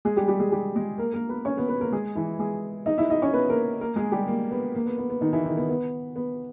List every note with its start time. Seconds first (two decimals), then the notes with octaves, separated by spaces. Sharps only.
0.05 G#3 G#4
0.16 G3 G4
0.28 G3 G4
0.39 G#3 G#4
0.52 G3 G4
0.75 G#3 G#4
0.98 A#3 A#4
1.14 A#3 A#4
1.29 B3 B4
1.45 C#4 C#5
1.57 B3 B4
1.69 B3 B4
1.81 A#3 A#4
1.92 G#3 G#4
2.15 E3 E4
2.39 G#3 G#4
2.86 D#4 D#5
2.98 E4 E5
3.10 D#4 D#5
3.22 C#4 C#5
3.33 B3 B4
3.49 A#3 A#4
3.81 A#3 A#4
3.96 G#3 G#4
4.12 G3 G4
4.27 A#3
4.51 B3
4.75 A#3
4.86 B3
4.98 B3
5.10 B3
5.21 D#3 D#4
5.33 E3 E4
5.44 D#3 D#4
5.57 B3
5.69 B3
6.16 B3